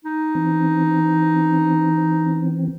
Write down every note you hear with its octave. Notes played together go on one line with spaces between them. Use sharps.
D#4
E3 C4